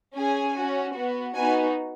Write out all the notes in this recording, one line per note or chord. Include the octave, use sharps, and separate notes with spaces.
C#4 G#4 G#5
C#4 F#4
B3 F#4
B3 D#4 F#4 G#5